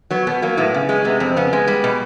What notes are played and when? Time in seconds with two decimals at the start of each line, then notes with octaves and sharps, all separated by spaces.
0.11 F#3 B3
0.27 B2 B3
0.42 F#3 A#3
0.57 A2 B3
0.74 C#3
0.89 G#3
1.05 C3 B3
1.20 F2 C4
1.36 C#3 B3
1.53 G#3
1.68 G3
1.84 B2